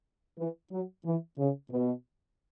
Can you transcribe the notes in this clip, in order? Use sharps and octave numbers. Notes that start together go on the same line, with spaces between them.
E3
F#3
E3
C#3
B2